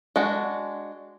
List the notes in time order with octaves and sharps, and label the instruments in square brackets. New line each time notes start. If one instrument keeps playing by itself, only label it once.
[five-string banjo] G#3 D4 F#4